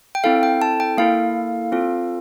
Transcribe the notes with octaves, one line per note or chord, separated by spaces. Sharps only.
G5
C4 E4 A4 F5
G5
A5
G5
A#3 E4 A4 F5
C4 F4 A4